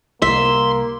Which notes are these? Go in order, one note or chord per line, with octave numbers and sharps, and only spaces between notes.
C2 G3 A#3 E5 C6